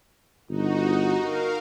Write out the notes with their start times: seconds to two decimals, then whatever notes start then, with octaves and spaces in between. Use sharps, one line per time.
0.49 G1 D#4 F#4
1.19 A#4 F5